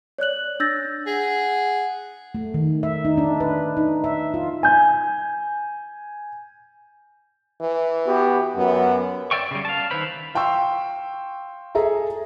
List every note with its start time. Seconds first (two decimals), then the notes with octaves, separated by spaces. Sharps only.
0.18 C#5 D5 F#6 F#7
0.60 D4 E6 G6 A6 A#6
1.07 G#4 F#5
2.35 A3
2.54 D#3
2.83 E5
3.05 D#4
3.18 D4
3.40 B4
3.77 D#4
4.04 E5
4.34 F4
4.63 G#5 G6
7.61 E3
8.06 B3 F#4 G4
8.56 F#2 B3
9.31 C#5 D5 E5 G5 C#6
9.51 C#3 G3
9.65 F5 A5
9.91 D#3 E4 B4 C5 B5
10.35 F5 G5 C6 C#6 E6
11.75 G#4 A4 E5 A#5